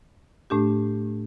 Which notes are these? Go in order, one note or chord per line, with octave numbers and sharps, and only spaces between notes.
A2 A3 D4 G4